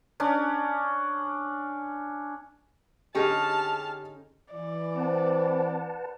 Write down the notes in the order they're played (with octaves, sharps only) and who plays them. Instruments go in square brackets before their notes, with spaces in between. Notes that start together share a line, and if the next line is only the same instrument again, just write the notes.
[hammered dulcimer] C#4 D4
[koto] D3 C#4 D#4 [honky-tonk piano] G4 G#4 D#5 [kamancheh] A5 F6
[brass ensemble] E3 [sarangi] D5
[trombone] C4 [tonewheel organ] B4 F#5 A5